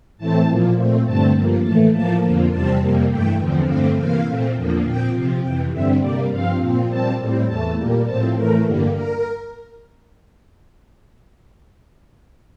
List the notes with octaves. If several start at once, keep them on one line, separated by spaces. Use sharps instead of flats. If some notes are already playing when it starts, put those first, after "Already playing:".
A2 E3 A3 C4 A5
A#2 F3 A#3
A#2 A3 C4
G2 D3 A3 C4 A5
G2 F3 A#3
A2 E3 A3 A5
A2 F3 A#3 A5
F2 D3 F3 A#3
E2 C3 G3 C4 A5
F2 C3 G3 A#3
G2 E3 A3 G5
E2 D3 F3 C4
G2 D3 A3 C4 F5
C3 E3 A#3 F5
A#2 A3 C4
E2 D3 F3 A#3
A#2 F3 C4 G5
C3 F3 C4
F2 C3 E3 G5
G2 D3 G3 C4 E5
C3 G3 A#3 D5
G2 F3 C4 F5
A#2 F3 C4
A#2 G3 C4 A5
A2 G3 C4
E2 E3 A3 A5
A#2 G3 A#3
A2 F3 C4 A5
A2 E3 A3 A#4
G2 D3 G3 A#3
A#4